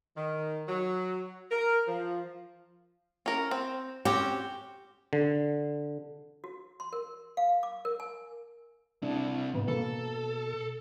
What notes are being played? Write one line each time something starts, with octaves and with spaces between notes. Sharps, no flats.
D#3
F#3
A#4
F3
C#4 A#4
C4
C4 C#4 F#4 G4
D3
F#4
C6
A#4
F5
D6
A#4
G#5
C3 D4 E4
G#2 B3
B2 A#3 A4